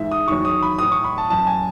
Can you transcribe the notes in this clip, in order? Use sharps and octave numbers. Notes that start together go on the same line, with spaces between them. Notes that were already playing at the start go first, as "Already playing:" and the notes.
Already playing: G#2 E3 E5
D#6
E2 D#3 F#3 C#6
D#6
B5
A2 E3 D#6
C#6
B5
A5
F#2 E3 A5
G#5